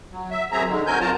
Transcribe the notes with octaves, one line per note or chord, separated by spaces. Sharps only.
F#3
E5
F#2 F#3 C4 G#4 E5 A#5
D3 D#3 G#3
F#3 C4 A#4 G#5 G6
F2 B2 F4 A#4 A5 A#5